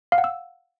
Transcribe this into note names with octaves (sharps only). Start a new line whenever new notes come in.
F5
F#5
E6